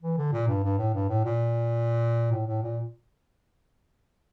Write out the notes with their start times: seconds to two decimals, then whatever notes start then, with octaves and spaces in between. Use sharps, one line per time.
0.02 E3
0.18 D3
0.33 A#2
0.48 G2
0.64 G2
0.78 A2
0.94 G2
1.09 A2
1.24 A#2
2.32 A2
2.47 A2
2.62 A#2